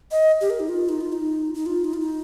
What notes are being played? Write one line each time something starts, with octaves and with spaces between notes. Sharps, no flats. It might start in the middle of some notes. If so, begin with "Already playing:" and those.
D#5
G4
A#4
D#4
F4
D#4
F4
D#4
D#4
F4
D#4
F4
D#4